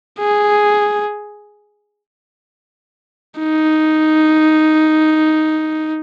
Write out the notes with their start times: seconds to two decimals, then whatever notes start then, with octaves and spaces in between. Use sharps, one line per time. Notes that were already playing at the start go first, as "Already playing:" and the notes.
0.19 G#4
3.40 D#4